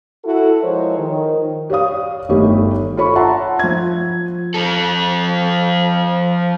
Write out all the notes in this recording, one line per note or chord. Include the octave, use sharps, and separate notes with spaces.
E4 F#4 A4
F3 G#3 A#4 C5 C#5
D#3
G4 C#5 D5 F5 D#6
G1 D#3 A3 G4 C#5
F4 A4 C#5 B5 C#6
E5 F#5 A5 A#5 C6
F3 G#6
F3 A4